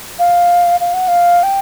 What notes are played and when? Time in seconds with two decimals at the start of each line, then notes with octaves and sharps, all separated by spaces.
0.19 F5
0.80 F5
0.94 F#5
1.08 F5
1.43 G5